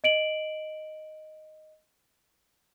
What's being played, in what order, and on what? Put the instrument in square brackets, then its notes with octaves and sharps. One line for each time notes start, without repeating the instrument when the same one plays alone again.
[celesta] D#5 D7 F#7